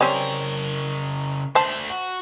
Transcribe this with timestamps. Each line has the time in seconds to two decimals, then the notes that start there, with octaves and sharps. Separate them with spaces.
0.01 C#3 G3 C4 C#4 A#4
1.55 A3 D4 C5 A5
1.90 F#4